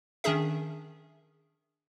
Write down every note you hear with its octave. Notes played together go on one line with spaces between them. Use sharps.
D#3 C#4 D4 G#4 E5